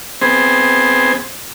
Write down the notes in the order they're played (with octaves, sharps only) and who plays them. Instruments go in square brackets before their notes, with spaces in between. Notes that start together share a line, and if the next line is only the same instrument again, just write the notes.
[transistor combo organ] B3 C4 G#4 C5